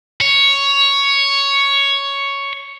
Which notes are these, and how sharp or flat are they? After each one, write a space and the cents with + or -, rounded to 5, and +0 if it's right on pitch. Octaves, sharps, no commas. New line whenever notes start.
C#5 +5